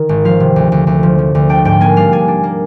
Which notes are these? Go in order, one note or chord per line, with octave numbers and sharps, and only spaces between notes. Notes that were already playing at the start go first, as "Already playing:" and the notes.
Already playing: D#3
G#1
F3 F5
C3
D2
D2
D2
F3
F3
D2
D4 G5
G#2 G5
A#3 G#5
G3 F5
D4 G#5
D4
A#3